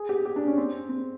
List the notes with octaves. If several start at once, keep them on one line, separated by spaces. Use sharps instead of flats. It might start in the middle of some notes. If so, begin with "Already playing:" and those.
Already playing: G#4
G4
G4
D4
C#4
C4
C4